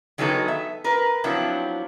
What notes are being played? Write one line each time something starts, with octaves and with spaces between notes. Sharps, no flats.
D#3 F#3 G#3 B3 D#4 A4
E5
A#4 B4
F3 F#3 B3 C4 D4 E4